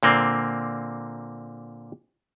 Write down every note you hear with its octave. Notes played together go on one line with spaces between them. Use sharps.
A#2 D3 A#3 C4